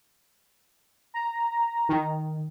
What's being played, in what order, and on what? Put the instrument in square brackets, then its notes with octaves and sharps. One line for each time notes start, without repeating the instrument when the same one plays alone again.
[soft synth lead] A#5
[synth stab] D#3